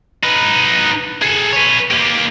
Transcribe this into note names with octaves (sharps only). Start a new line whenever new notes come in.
D#4 B4
G#4 A4
B4 C#5
A#3 G4